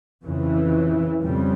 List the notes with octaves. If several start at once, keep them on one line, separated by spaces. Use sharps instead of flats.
F2 C#3 E3
F2 C#3 G3